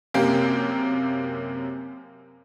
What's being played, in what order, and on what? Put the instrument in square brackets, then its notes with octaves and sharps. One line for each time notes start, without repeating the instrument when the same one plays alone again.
[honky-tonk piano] F#2 C3 A#3 G4